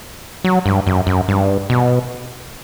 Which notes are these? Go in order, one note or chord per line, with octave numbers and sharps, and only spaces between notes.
F#3
G2
F#2
F#2
G2
B2